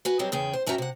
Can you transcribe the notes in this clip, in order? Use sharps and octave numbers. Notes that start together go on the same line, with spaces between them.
F#4 B4 G#5
F#3 G3 C4 G4 D#5
E2 C#3 G#4 G5
C5
G2 C#4 F#4 E5 G5 A#5
C3 F#5